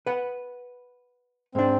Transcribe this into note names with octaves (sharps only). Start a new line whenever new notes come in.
B4 F#5
G#2 C4 D4